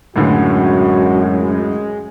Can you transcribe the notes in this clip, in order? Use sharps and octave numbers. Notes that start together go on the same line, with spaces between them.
C#2 F#2 A2 D3 G#3 F#4